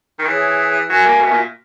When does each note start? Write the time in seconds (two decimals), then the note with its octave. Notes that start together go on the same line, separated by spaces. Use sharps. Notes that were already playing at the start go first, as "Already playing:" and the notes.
0.19 D#3
0.26 E3 G#4 C#5 E5
0.90 F#3 F#4 A#4 E5 G#5
1.05 A#3
1.21 B2
1.32 A#2